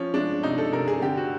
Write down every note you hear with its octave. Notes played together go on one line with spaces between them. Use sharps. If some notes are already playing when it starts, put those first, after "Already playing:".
Already playing: F3 C#4
G#3 D4
C3 D#4
A4
C3 A#4
G#4
D3 G4
F#4